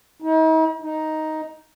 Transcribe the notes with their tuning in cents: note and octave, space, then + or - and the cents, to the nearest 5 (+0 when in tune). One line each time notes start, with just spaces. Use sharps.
D#4 +45
D#4 +5